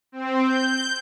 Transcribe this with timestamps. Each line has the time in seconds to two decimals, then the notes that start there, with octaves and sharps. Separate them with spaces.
0.12 C4
0.42 G6